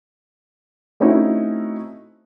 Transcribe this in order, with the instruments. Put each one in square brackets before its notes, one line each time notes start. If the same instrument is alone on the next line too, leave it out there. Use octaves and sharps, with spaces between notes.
[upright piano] A3 C4 C#4 D#4 E4 F#4